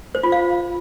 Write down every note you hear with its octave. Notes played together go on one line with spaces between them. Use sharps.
C5
F4
F5